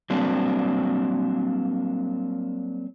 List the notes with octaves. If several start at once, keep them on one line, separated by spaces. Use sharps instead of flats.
F#3 G3 A#3 C4 D4